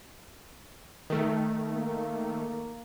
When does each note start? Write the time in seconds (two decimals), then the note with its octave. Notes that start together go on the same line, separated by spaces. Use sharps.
1.10 D#3 A3
1.74 A#3